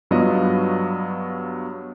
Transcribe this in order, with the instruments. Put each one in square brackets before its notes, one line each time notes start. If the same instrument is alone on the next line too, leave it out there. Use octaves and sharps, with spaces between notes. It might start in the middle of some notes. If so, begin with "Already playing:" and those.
[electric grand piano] G2 F#3 B3 F4 D#5